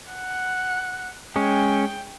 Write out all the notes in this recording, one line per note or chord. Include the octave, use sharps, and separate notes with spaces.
F#5
G#3 C#4 G5